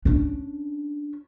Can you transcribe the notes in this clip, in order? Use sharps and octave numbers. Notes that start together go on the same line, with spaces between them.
C#4 D4